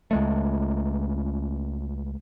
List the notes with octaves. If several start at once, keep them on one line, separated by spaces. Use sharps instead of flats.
C#2 G#3 A3